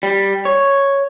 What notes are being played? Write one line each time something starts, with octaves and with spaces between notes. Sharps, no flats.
G3
C#5